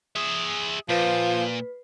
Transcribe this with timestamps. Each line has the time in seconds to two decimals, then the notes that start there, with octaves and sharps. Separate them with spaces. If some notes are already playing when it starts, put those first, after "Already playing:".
0.16 G#4 E5 D#6
0.89 A#2 F3 B4 B6 C7